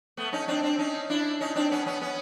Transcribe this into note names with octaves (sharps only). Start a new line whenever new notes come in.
A3 B3
C#4 D#4
C4 D4
C4 D4
C#4 D#4
D4 E4
C#4 D#4
C4 D4
B3 C#4
B3 C#4
B3 C#4